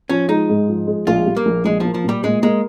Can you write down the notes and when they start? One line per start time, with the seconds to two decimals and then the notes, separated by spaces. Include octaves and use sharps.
0.09 F3 C#4
0.29 G#3 D#4
0.49 G#2
0.68 F3
0.87 G#3
1.07 A#1 F4
1.26 G3
1.36 A#3
1.46 A#1
1.65 A#1 G#3
1.80 F3 A#3
1.94 F3
2.04 A#2 G3
2.24 A#2 G#3
2.43 G#3 A#3